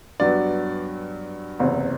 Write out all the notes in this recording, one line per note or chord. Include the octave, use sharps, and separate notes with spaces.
G2 F#3 B3 D5
F#1 E2 C3